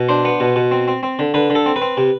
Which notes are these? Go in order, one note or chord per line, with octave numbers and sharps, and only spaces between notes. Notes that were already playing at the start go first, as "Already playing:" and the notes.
Already playing: B2
D4 C5
B3
B2
B2
C4
C4
C4
D3
D3 B4
D3
A4
C4
B4
C4
C3